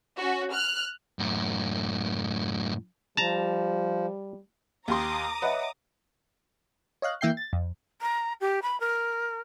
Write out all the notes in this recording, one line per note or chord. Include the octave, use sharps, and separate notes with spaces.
C#4 F#4
F6 F#6
F#2 A2
F3 G3 A5 A#5
D#2 G4 A#5 C6 D6 D#6
B4 C#5 D#5 E5 F#5
C#5 D#5 F5 F#6
E3 A#3 E5 G5 G6 C7
A6
F2
A#5
G4
B5
A#4